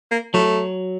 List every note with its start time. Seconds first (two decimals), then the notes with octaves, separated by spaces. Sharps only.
0.11 A#3
0.34 F#3 A3